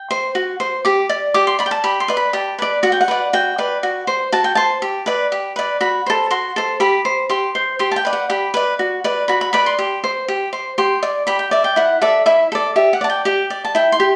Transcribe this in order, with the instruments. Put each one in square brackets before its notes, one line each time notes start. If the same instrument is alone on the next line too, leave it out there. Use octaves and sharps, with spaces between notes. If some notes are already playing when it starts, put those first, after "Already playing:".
Already playing: [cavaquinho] G5
C5
F#4
C5
G4 D6
D5
G4 D6
C6
D5 B5
G5
A5
G4 B5
C6
B4 D5
B5
G4 A5
B4 D5
F#4 F#5
G5
F#5
B4 D5
F#4 G5
B4 D5
F#4
C5
F#4 A5
G5
C5 A5
G4
B4 D5
G4
B4 D5
F#4 B5
A4 C5
F#4 C6
A4 C5
G4 B5
C5
G4 C6
C5
G4 C6
A5
G5
B4 D5
F#5
G4 B5
B4 D5
F#4
B4 D5
F#4 B5
B5
B4 D5 B5
C6
G4
C5
G4
C5
G4 C6
D5
G4 B5
G5
D5 E5
G5
E4 F#5
A4 D5 E5
E4 E5
A4 D5
G4 E5
F#5
D5 A5
G5
G4 G5
D5
A5
E4 G5
C6
G4